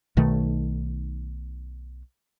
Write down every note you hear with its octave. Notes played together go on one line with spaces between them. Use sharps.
B1 B2 D#3 A3